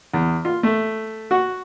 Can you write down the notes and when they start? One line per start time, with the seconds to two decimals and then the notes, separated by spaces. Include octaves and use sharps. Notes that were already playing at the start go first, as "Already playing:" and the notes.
0.14 E2
0.45 F4
0.63 A3
1.31 F#4